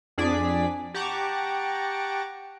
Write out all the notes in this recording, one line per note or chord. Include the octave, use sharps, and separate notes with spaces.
F2 D4 G#4 D5 B6
G4 F#5 A5 A#5 C#6 D6